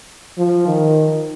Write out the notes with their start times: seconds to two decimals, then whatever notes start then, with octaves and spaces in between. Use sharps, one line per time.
0.38 F3
0.67 D#3